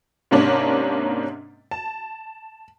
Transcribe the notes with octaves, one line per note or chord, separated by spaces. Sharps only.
G#2 C3 A#3 C#4 D4
A5